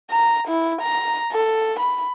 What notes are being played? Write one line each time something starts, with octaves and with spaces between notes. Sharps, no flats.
A#5
E4
A#5
A4
B5